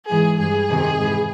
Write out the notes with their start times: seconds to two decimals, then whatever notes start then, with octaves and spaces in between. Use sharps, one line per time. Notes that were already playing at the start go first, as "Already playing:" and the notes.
0.11 G#2 E3 G#4
0.40 G2 E3 G#4
0.69 F2 C3 D#3
0.98 G#2 E3